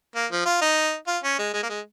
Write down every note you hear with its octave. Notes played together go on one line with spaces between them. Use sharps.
A#3
F3
F4
D#4
F4
C#4
G#3
G#3
A#3
G#3